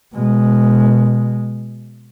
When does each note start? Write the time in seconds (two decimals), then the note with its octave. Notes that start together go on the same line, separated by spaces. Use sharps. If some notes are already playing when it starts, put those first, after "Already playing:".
0.14 B2 G#3